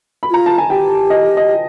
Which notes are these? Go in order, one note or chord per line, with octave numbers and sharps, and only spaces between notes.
B5
F4 A#5
A5
G#5
G4 G5
D#5
D#5